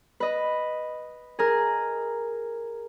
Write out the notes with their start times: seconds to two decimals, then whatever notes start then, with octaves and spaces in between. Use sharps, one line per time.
0.20 B4 D#5
1.39 G#4 A#4